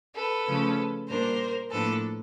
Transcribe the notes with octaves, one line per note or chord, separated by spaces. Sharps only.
A4 B4
C#3 F3 A3 C#4
A#2 G3 A#3 D4 A#4 C5
A2 F3 A#3 D4 A4 B4